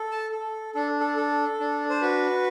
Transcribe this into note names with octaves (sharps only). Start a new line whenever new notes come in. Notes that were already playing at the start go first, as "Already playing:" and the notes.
Already playing: A4
A5
A4
D4 A4
A4
A4
D4
C5
F#4 B4